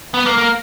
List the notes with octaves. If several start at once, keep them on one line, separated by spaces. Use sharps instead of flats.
B3
A#3
A#3